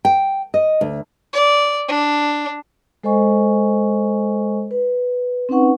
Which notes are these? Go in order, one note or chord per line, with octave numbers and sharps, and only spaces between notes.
G5
D#5
D2
D5
D4
G#3 A4 C5 D#5 G#5 C#6
B4
C4 C#4 D#4 B4 F#5 C#6